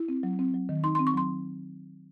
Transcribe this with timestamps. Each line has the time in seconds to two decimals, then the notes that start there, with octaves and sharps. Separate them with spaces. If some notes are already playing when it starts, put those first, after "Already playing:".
Already playing: E4
0.08 C4
0.23 F#3
0.39 C4
0.54 F#3
0.69 D#3
0.84 D#4 C6
0.95 C4 C6
1.07 C#6
1.14 F#3 C6